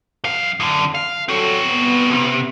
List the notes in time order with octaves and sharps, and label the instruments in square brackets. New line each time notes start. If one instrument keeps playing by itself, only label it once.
[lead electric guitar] F#2 F5
F#2 D3
F5
[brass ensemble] F#3 A4 [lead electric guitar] C4 F#4
[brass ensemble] B3
[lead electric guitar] C2 C3